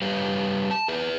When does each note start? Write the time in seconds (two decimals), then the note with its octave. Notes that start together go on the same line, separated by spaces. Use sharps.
0.02 G3 G4 B4 C#5 F5
0.71 A5
0.88 G#4 B4 E5